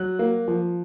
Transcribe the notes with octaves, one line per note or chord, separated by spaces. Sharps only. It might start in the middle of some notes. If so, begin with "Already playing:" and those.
Already playing: F#3 F#6
A#3
F3